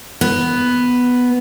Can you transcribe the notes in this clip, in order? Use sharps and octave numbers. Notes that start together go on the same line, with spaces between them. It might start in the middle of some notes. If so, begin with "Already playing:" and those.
B3